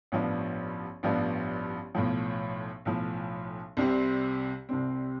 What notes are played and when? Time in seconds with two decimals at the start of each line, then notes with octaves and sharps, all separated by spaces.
0.12 A1 G2 F3 B3 D4
1.03 A1 G2 F3 B3 D4
1.95 B1 A2 F3
2.85 B1 A2 F3
3.77 C2 C3 G3 C4
4.69 C2 C3 G3 C4